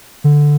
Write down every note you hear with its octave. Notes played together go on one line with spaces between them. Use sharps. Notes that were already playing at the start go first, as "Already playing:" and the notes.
D3